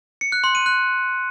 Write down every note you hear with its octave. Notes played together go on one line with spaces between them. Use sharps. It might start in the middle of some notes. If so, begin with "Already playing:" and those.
C#7
F#6
C6
D#7
F#6